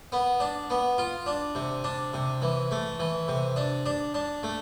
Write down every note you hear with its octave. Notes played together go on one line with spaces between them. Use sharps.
B3
D4
B3
F4
D4
C3
D4
C3
E3
A3
E3
C3
D4
D4
D4
A3